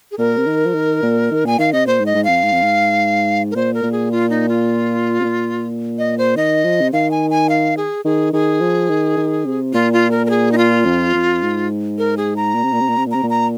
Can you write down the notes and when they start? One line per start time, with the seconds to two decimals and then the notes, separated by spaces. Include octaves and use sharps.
0.12 G#4
0.18 A#2 A#4
0.37 C3
0.47 D#3
0.66 F3
0.74 D#3
1.03 A#2
1.31 D#3
1.45 A#2 G#5
1.59 D#3 F5
1.73 C3 D#5
1.87 A#2 C5
2.01 G#2
2.06 D#5
2.15 G#2
2.24 F2 F5
2.43 G#2
2.52 F2
2.62 G#2
3.51 A#4
3.56 A#2 C5
3.74 A#4
3.83 A#2
3.92 G#4
4.11 F4
4.30 D#4
4.49 F4
5.20 C3
5.24 A#2
5.99 D#5
6.18 C5
6.36 D#3 D#5
6.64 F3
6.81 C3
6.93 D#3 F5
7.11 G#5
7.31 G#5
7.49 F5
7.77 G#4
8.05 D#3 G#4
8.33 D#3 G#4
8.61 F3
8.90 D#3
9.17 D#3
9.46 C3
9.73 A#2 F4
9.93 F4
10.11 A#4
10.26 A#4
10.30 G#4
10.52 D#4
10.58 F4
10.85 F2
11.15 F2
11.43 G#2
11.98 A#4
12.17 G#4
12.36 A#5
12.55 A#2
12.64 C3
12.72 A#2
12.81 C3
12.88 A#2
12.97 C3
13.06 A#2
13.11 C3 A#5
13.23 A#2
13.30 A#5